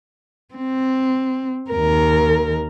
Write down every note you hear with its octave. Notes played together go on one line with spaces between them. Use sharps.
C4
D#2 A#4